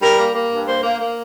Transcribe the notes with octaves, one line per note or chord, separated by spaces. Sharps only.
G3 A#4
A#3
A#3
G2
A#3 C5
A#3
A#3